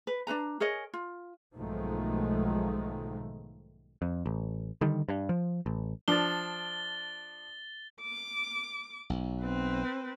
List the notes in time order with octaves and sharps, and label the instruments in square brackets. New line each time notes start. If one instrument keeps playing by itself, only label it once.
[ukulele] B4
D4 D#4 B4 A#5
G#4 A#4 C#5 D#5
F4
[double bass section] B1 G#2 D#3 F3 G#3 A3
[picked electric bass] F2
A1
D3 D#3 G3
G2
F3
A1
[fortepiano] F3 D4 [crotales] A6 G7
[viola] D6
[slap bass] B1
[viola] C4 B4